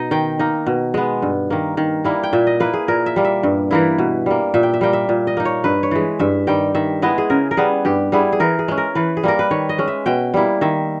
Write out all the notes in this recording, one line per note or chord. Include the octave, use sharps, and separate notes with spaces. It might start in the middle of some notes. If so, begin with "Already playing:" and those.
Already playing: B2 D#4 D#5
D#3 G5
A#3 D#4
B2
G#3 B3
G2
D#3 A#3
D#3
G3 A#3 E4
G5
A#2 E5
D#5
A#3 E4 B4
G#4
A#2 A#4
E5
G3 A#3
E5
G2
E3 A#3 E4
B2
G3 A#3
A#2 E5
G5
E5
G3 A#3 G5
E5
A#2
D#5
A#3 D#4
C#5
G2 B4
C#5
E3 G#3
G2 E5
D#3 G3 G5
D#3 E5
G#3 B3 E4 D#5
G#4
C#3 A#4
A#4
G3 B3 G#4
G2 G4
G3 B3 E4 G#4
G#4
E3 A#4
G#4
G#3 C#4
A#4
E3 B4
G#4
G3 A#3 A#4
B4
D#3 C#5
D#5
G#3 C#4
E5
B2 G5
G3 A#3 E4
D#3 E5